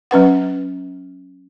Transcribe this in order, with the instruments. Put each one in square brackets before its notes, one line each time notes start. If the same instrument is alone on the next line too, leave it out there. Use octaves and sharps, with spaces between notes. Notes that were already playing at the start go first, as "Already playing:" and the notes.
[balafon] F#3 C#4 B4 F#5